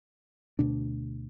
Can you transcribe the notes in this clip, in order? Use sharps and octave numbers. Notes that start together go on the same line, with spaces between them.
D2 B2 D4